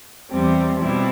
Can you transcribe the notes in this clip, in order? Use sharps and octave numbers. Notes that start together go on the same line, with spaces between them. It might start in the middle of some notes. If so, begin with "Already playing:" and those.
E2 C3 G3 C4
B2 G3 C4 E4